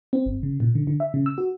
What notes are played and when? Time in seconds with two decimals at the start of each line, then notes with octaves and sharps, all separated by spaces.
0.13 C4
0.26 G1
0.43 C#3
0.60 A#2
0.75 D3
0.87 D3
1.00 E5
1.14 C#3
1.26 E6
1.38 F#4